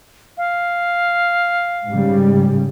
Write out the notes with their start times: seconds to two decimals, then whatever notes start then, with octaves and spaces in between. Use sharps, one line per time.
0.37 F5
1.89 G#2 C#3 G3